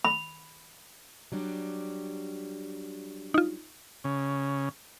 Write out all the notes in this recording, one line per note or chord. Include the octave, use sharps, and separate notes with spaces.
B5
F#3 G3 D4
D#4 F4
C#3